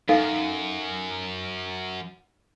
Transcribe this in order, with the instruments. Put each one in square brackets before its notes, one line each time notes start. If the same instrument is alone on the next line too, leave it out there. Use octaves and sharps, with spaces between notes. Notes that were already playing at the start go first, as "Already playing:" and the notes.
[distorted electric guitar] F#2 [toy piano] D#4 A4 F5